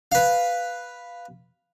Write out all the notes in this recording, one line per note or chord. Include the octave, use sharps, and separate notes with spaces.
B4 F5